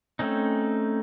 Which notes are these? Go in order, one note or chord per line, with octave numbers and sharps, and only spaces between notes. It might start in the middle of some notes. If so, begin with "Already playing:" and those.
A3 C4 C#4 D#4